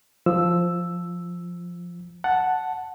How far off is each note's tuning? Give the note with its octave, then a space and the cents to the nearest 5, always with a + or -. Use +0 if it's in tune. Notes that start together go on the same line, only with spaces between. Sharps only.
F3 +0 E6 +0
F#5 +0 A5 +0